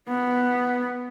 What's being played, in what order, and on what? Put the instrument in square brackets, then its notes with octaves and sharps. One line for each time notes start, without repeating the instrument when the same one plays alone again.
[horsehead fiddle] B3